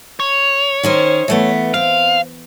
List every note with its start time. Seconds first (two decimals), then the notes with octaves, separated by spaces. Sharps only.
0.20 C#5
0.83 D#3 C#4 C5
1.28 E3 A3 B3
1.74 C4 F5